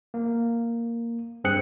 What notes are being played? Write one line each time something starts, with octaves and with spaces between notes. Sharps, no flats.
A#3
G2 C4 G#4 F#6 C#7